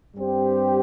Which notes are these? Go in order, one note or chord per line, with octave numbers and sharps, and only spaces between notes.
G2 G3 C4 G4 C5